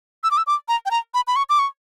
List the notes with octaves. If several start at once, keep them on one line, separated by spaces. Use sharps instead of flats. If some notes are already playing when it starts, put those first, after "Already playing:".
E6
D6
E6
D6
A#5
G5
A#5
B5
B5
C#6
D6
C#6